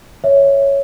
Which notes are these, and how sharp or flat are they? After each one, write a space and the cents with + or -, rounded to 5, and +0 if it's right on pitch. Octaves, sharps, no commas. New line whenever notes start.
C#5 +0 E5 +0